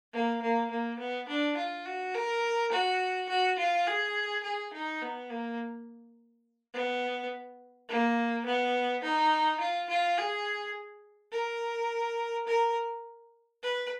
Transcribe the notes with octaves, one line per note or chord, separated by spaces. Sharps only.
A#3
A#3
A#3
B3
D4
F4
F#4
A#4
F#4
F#4
F4
G#4
G#4
D#4
B3
A#3
B3
A#3
B3
D#4
F4
F4
G#4
A#4
A#4
B4